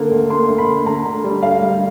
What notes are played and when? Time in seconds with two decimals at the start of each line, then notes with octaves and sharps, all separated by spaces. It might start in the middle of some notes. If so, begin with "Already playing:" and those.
Already playing: D3 A#3
0.11 D2
0.30 A#3 C6
0.48 D2
0.58 B5
0.68 D2
0.86 D2 A#5
1.06 D3
1.24 G3
1.43 D2 F5
1.62 G3